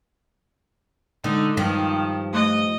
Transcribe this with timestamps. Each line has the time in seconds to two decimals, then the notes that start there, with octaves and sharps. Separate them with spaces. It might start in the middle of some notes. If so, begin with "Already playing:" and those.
1.24 D3 G#3 D#4
1.57 G2 D#3 F3
2.33 A3 D#5 D6 F#6